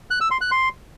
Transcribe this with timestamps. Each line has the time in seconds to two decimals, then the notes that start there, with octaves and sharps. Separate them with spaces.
0.11 F#6
0.21 E6
0.31 C6
0.41 F#6
0.51 C6